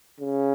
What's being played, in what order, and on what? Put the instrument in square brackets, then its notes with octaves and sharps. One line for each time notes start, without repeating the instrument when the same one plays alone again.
[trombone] C#3